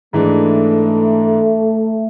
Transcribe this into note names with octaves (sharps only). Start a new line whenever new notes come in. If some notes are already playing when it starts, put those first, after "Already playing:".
G#2 E3 G#3 A3 D4